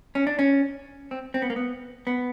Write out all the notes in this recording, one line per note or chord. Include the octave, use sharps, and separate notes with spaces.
C#4
D4
C#4
C4
C4
B3
A#3
B3
B3